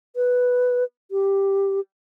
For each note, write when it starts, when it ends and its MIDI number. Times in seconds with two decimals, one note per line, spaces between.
0.16 0.84 71
1.11 1.80 67